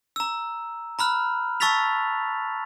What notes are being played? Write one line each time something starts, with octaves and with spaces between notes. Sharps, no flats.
A#5 E6
A#5 B5 F6 F#6
A5 C#6 E6 A6 B6 F7